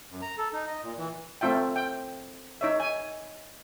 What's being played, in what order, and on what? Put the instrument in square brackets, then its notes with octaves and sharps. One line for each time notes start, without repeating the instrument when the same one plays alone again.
[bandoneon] F#2
A#5
A4
D#4
D#5
A#2
E3
[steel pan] A3 C4 F4 E5 G5
G5
D#4 C#5 E5
G#5